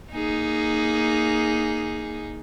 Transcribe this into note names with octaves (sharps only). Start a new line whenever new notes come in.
A#3 D#4 G#4